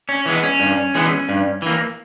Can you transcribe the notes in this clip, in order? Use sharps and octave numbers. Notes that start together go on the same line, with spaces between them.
C#4
E3 G#3 B3
C#4
G2
E3 G#3 B3
G2
E3 A#3